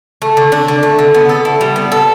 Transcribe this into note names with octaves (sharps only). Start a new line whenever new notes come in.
A3
D3
D4
D3
A3
D3
B3
A4
E4
G3
B3
A4